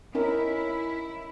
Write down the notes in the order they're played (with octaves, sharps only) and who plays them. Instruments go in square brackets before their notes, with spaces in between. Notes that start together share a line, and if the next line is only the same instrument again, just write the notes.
[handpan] C#4 D#4 A#4 [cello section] E4